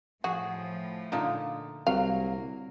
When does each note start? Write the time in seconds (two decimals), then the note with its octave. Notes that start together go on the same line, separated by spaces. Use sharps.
0.24 A2 F3 A3 F#4 G#4
1.12 A#2 D3 D#4
1.87 C2 F#3 A#3 F5